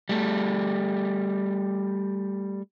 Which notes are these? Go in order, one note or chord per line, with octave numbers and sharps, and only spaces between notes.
G3 A3